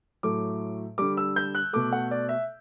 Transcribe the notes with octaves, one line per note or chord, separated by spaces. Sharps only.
A2 F#3 A3 D6
D3 G3 D6
E6
G6
F#6
B2 A3 D6
F#5
D5
E5